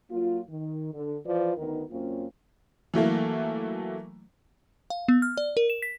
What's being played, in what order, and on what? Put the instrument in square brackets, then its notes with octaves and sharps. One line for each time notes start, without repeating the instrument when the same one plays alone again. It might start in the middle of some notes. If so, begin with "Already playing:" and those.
[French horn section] F#3 A#3 F4
D#3
D3
E3 F3 F4 B4 D5
D2 D#3 B3 D#4 A#4
F#2 A#3 C4 C#4 F4
[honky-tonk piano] E3 F#3 A3 A#3
[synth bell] F5
B3
F6
D5
A#4
E7
B6